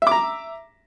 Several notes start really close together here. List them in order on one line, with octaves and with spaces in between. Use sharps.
E5 D6 A#5